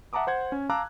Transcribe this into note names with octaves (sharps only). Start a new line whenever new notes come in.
E5 F#5 A5 A#5 D6 D#6
C5 F#5 G#6
C#4
F5 A5 A#5 D6 E6 F#6